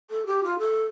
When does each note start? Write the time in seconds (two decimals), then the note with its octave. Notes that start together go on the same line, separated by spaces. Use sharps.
0.10 A4
0.26 G4
0.43 F4
0.59 A4